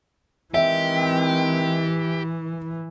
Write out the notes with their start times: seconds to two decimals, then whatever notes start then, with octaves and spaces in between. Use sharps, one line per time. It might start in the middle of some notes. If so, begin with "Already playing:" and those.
0.54 D#3 E3 G#3 C4 G4 E5